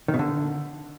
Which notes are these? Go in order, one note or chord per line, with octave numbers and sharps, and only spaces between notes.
D#3
B2
D3